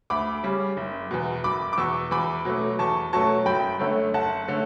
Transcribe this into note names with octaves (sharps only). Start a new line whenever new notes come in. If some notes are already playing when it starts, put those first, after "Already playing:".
D2 B5 D6
C#3 G3
F#1
E2 B2
F#1 B5 D6
D6
E2 B2 C#6 E6
E2 B5 D6
B2 F#3 A3 C#4
E2 A5 C#6
B2 F#3 A3 C#4 A5 C#6
F#1 G5 B5
F#2 D3 A3 C#4
F#1 F#5 A5
D3 A3 C#4